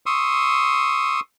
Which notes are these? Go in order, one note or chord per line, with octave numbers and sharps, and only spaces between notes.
C6 C#6 D#6 E6